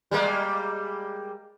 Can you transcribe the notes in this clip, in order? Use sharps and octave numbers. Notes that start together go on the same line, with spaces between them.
G3 G#3 A#3